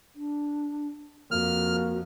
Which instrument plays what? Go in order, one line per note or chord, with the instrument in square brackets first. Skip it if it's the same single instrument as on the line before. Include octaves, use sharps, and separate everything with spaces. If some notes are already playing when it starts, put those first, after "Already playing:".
[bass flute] D4
[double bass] F2 [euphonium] A#3 [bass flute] F#4 [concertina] F6